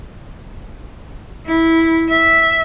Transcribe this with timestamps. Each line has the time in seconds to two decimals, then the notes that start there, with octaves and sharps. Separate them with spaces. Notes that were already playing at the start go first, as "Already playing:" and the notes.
1.47 E4
2.09 E5